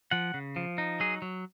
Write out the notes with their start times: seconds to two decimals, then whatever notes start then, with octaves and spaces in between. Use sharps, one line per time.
0.11 F3 F#5
0.34 C#3
0.56 F3
0.78 D#4
1.00 F#3 G#4
1.22 F#3